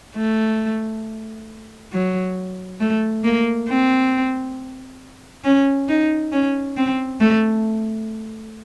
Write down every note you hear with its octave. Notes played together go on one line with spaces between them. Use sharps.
A3
F#3
A3
A#3
C4
C#4
D#4
C#4
C4
A3